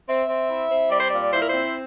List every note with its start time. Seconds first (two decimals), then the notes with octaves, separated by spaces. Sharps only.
0.08 C4 E5
0.28 C4
0.50 E4
0.71 C4
0.91 G3 D5
1.00 C5
1.08 A#2 D5
1.32 E4 C5
1.41 A#4
1.49 C4 C5